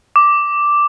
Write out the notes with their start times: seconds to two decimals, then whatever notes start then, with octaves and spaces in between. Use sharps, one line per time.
0.16 D6